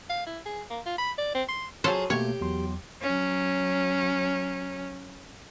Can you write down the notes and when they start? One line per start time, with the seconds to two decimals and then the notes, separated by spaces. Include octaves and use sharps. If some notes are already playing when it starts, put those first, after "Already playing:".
0.10 F5
0.27 E4
0.46 G#4
0.70 A#3
0.86 F4
0.98 B5
1.18 D5
1.35 C4
1.49 C6
1.84 F#3 F4 G#4 A4 C5
2.10 B2 A3 A#3 G4 C#5
2.41 E2 F#3 C6
3.02 F#3 C#4